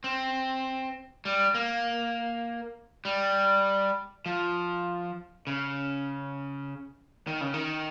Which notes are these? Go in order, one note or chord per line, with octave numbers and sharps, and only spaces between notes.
C4
G3
A#3
G3
F3
C#3
D#3
C#3
D#3